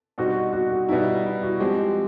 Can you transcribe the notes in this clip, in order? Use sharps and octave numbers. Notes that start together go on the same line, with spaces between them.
B2 G3 C4 D#4 F#4
F#4
F#4
B2 G3 B3 D#4 E4
E4
F#4
F3 G#3 C4 G4